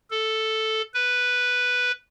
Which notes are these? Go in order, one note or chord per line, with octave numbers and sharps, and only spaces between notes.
A4
B4